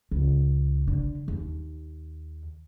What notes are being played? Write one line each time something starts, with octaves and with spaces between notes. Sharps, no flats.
C#2
D3
D#2